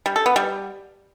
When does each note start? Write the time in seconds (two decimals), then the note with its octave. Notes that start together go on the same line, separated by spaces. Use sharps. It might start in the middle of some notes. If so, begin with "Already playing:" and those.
0.06 G3
0.16 A4
0.26 B3
0.36 G3